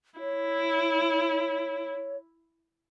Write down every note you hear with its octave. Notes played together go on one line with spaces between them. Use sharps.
E4 C#5